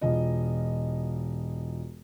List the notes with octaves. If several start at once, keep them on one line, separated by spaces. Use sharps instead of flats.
E1 F4 D#5